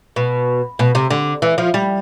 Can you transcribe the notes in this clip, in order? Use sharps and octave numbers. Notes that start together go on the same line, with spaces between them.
B2
B2
C3
D3
E3
F3
G3